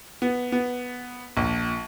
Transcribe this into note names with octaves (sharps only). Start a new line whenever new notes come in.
B3
B3
A#1